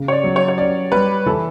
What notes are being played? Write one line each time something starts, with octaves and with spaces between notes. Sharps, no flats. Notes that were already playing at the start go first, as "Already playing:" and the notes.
Already playing: C#3
C#5
D5
F#3
C#5
C#5
C#4 D5
G3 B4
E3 A4